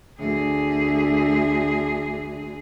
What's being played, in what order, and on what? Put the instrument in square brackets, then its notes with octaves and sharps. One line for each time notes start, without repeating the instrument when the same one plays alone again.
[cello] D2 G#4